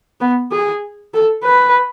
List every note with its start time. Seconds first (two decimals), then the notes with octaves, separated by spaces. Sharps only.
0.21 B3
0.52 G#4
1.14 A4
1.45 B4